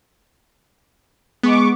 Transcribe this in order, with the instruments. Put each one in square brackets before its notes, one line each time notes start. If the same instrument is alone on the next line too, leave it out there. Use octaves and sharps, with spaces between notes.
[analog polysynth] G#3 C#6 D6 [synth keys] B3